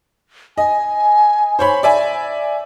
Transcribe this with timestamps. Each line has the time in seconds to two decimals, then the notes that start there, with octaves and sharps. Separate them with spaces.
0.58 D#5 G#5
1.59 C5 C#5 B5
1.83 D5 E5 G#5